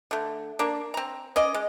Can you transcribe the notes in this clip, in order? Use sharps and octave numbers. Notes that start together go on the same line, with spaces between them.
D3 A3
A#3 D4
C4 A#5
C#4 D5 D#5
G#3